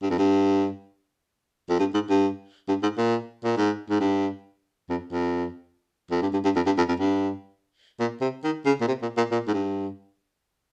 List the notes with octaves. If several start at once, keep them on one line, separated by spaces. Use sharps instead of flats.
G2
F2
G2
F2
G2
G#2
G2
G2
G#2
A#2
A#2
G#2
G#2
G2
F2
F2
F2
G2
G2
G2
F2
G2
F2
F2
G2
A#2
C3
D#3
C#3
A#2
C3
A#2
A#2
A#2
G#2
G2